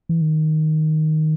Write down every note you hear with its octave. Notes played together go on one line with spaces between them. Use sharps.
E3
D#3